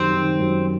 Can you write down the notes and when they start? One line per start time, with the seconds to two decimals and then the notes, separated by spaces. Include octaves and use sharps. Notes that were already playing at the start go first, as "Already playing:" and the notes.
Already playing: F#2 D#3 G3 C4
0.14 D#3
0.39 F#2